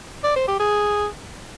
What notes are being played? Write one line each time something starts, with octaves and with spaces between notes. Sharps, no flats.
D5
C5
G4
G#4